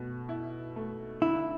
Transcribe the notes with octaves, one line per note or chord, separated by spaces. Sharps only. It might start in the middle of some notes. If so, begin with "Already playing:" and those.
Already playing: B2 A3
E4
A3
D3 E4